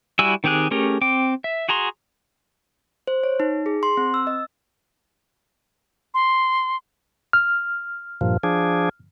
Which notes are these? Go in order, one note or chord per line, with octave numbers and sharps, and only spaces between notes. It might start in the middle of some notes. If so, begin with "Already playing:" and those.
G3 E4 F#4 G#5 E6
D#3 C4 G4 G#4 F#6
A3 C#4 G4 G#4 A#4
C4 G5 D6
E5
F#4 G#4 A#5 C6
C5
C#5
D#4
G#4
C6
C4
E6
D#5
C6
F6
G2 A#2 F3
F3 D4 G#4